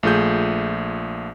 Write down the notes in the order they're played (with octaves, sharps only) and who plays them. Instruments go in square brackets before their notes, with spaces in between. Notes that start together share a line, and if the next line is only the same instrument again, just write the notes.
[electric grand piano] A#1 A3 F4 G#4 G6